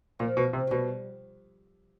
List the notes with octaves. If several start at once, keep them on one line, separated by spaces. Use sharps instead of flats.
A#2 F3
B2
C3
F#3
B2 G3